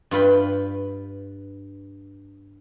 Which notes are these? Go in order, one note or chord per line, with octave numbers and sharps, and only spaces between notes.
G2 F4 B4 G5